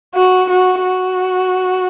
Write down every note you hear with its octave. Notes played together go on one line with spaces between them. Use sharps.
F#4
F#4
F#4